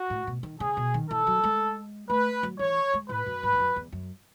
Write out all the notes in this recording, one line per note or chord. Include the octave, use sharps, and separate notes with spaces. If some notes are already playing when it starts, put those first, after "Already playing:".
Already playing: F#4
A2
B2
D#3
C#3 G#4
B2
D#3
E3 A4
F#3
G#3
A3 B4
F#3
E3 C#5
G#3
A2 B4
F#2
G#2
E2
F#2
E2
F#2